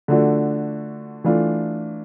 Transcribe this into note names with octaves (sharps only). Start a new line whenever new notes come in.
D3 F3 A3 D4 F#4
E3 A3 D4 F4